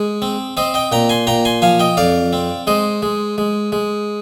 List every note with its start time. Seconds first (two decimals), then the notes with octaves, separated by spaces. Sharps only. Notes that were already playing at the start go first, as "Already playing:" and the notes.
Already playing: G#3 G#4
0.22 C4
0.57 C4 C5 D#5
0.74 D#5 G5
0.92 A#2 G5 A#5
1.09 G#5 C6
1.27 A#2 G5 A#5
1.45 G#5 C6
1.62 F3 F5 G#5
1.79 D#5 G5
1.97 F2 D5 F5
2.33 C4
2.67 G#3 C5 D#5
3.02 G#3
3.38 G#3
3.72 G#3